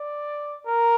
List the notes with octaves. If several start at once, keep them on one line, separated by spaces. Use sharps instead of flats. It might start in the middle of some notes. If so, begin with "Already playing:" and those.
Already playing: D5
A#4